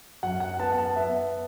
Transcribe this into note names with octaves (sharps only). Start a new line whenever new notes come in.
F#2 F#5
F#5
F#5
B3 A5
F#5
A5
B3 E5